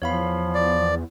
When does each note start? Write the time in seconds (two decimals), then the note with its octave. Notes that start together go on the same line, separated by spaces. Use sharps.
0.02 E2 F3 C#5 F5 B5
0.54 D5